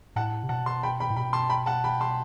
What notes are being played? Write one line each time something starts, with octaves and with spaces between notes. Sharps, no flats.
A2 F#5 A5
C3
B2 F#5 A5
A5 C6
G5 B5
G5 B5
A2
B2 G5 B5
A5 C6
G5 B5
F#5 A5
G5 B5
A5 C6